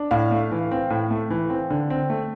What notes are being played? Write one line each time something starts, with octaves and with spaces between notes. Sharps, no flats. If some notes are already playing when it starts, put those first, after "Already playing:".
Already playing: D4
A2 F5
A3
E3
C4
A2
A3
E3
C4
D3
C4
A3